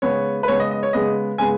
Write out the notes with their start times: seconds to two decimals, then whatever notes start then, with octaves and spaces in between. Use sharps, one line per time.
0.02 C#3 G#3 B3 C#5
0.43 B4
0.48 C#3 G#3 B3 C#5
0.60 D#5
0.71 D#5
0.83 C#5
0.93 C#3 G#3 B3 D#5
1.38 C#3 G#3 B3 G#5